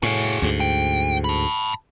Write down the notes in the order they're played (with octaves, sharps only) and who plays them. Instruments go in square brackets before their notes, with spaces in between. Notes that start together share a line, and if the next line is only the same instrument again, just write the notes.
[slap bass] A2 [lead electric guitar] F#4 G#4
[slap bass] D2 G#2
[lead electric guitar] G5
A5 B5